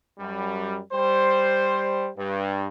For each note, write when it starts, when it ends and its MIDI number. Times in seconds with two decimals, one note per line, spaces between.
0.18 0.78 42
0.18 0.78 55
0.92 2.09 55
0.92 2.09 72
2.17 2.67 43